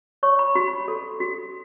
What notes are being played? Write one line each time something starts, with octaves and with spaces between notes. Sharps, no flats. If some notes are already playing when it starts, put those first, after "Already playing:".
C#5 C#6
B5
F#4 B5
A4
F#4